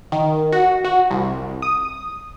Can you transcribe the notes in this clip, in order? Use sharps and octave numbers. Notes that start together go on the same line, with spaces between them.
D#3
F#4
F#4
C2
D#6